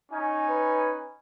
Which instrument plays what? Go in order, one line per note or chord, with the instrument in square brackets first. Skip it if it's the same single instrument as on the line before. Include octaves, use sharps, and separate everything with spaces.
[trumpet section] C#4 D#4 G#5
[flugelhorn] B4